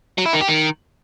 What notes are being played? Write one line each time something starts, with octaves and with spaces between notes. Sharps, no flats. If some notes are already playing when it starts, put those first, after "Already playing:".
F#3
E4
D#3
G4
D#3